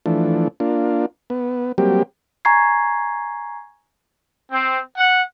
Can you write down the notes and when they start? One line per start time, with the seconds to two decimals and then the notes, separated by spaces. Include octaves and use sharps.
0.06 E3 F3 A3 D4
0.60 A#3 D4 F4
1.30 B3
1.78 F#3 G3 A#3 C4 G4
2.45 G#5 A#5 C#6 G#6 C7
4.51 C4
4.97 F#5